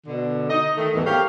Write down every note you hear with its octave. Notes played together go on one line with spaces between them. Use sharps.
B2 D3
D#4 D#5
D#3 A3
E2 G#2 E3 G3 A3
G4 A#4 C#5 F5